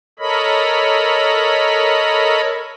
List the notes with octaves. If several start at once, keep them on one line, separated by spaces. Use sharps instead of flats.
A4 A#4 C#5 D#5 B5